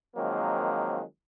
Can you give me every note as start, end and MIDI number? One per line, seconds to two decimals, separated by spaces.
0.16 1.02 51
0.16 1.02 53
0.16 1.02 54
0.16 1.02 56
0.16 1.02 58
0.16 1.02 60